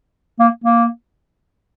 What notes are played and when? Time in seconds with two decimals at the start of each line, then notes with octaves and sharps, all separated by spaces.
0.40 A#3
0.64 A#3